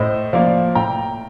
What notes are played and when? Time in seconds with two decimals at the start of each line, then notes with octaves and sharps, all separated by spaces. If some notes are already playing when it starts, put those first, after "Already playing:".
Already playing: A2 C5 D#5
0.33 F3 A#3 D5 F5
0.75 A2 G5 A#5